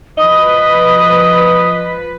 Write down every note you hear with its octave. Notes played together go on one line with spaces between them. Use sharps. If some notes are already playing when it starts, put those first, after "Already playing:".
F3 B4 D#5 D#6